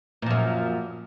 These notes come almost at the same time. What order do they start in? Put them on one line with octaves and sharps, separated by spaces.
A#2 F3 F#2